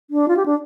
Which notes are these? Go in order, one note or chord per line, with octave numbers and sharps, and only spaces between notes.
D4
F4
G4
D4